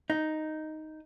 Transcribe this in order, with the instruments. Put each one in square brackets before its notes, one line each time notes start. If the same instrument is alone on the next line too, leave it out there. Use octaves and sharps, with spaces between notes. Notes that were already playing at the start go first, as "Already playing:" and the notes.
[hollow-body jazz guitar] D#4